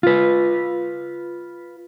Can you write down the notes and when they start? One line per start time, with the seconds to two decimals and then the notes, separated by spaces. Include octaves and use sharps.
0.03 F4 B4